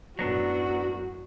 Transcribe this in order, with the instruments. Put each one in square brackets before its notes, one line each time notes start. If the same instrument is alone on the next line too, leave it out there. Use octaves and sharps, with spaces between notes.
[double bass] F#2 A2 [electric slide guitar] F#3 B3 D4 [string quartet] F#4